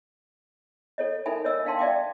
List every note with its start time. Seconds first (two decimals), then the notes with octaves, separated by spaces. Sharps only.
0.98 A4 C#5 D#5
1.26 D#4 A4 A#4 E5 G#5 B5
1.45 C#5 D#5 E6
1.65 D4 E5 F5 G5 A5 C6
1.79 D5 E5 G5 D6